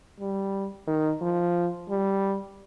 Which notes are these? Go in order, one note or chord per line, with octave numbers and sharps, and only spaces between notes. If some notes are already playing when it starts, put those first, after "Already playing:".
G3
D#3
F3
G3